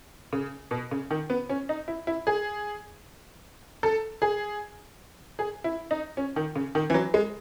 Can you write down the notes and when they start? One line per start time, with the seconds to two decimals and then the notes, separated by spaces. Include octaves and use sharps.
0.33 C#3
0.71 B2
0.91 C#3
1.11 D#3
1.30 B3
1.49 C#4
1.69 D#4
1.88 E4
2.07 E4
2.27 G#4
3.83 A4
4.22 G#4
5.39 G#4
5.64 E4
5.91 D#4
6.17 C#4
6.36 D#3
6.56 C#3
6.75 D#3
6.90 E3
6.94 F#3
7.14 G#3